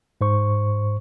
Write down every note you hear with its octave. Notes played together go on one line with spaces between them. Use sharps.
G#2 C5 C#6